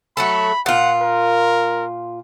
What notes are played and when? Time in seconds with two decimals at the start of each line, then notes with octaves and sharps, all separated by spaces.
0.17 F#3 A3 A4 B5
0.66 A#2 F4 F#5
1.01 A#4